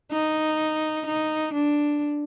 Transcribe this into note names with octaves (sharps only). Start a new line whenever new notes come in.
D#4
D#4
D4